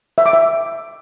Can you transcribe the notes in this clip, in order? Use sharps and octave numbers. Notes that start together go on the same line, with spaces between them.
E5
D6
E5